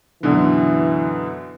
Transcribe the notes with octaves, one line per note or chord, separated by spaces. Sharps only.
F#2 B2 D3 E3